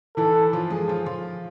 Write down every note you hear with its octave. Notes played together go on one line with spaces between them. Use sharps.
E3 E4 A4
F3 F4
G#3 G#4
F3 F4
F3 F4